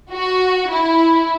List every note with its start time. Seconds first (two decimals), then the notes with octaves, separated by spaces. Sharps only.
0.11 F#4
0.69 E4